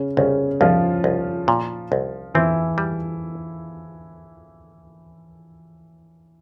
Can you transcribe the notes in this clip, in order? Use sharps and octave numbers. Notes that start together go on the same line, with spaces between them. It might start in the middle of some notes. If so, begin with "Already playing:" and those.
Already playing: C#3 C#4
C2 C#3 C#4
C2 F3 F4
C2
A#2
C2
E3 C4 E4
G3